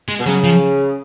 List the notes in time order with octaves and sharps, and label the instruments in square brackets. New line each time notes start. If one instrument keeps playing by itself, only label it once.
[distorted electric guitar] G#3
[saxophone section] B2
[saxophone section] C#3 [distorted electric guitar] F#3
[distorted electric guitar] F3